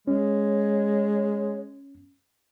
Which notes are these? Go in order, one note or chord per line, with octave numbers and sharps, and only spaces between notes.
G#3 C#4 C#5